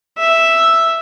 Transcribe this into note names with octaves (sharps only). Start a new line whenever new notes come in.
E5